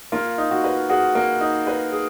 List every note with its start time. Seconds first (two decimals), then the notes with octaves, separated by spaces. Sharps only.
0.12 A#3 F4
0.38 D#4
0.51 F#4
0.64 B4
0.89 F#4 G#4
1.15 A#3
1.41 D#4
1.67 B4
1.92 G#4